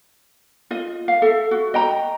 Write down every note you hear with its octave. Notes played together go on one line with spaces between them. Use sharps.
F4 D#5
F5
A4 E5
F#4
D#5 G5 A#5